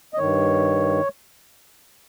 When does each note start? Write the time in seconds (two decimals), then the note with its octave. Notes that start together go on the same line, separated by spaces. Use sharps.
0.14 D#5
0.18 G2 D#3 C#5